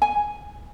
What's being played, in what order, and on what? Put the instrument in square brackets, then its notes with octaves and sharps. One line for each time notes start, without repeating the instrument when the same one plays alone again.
[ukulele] G#5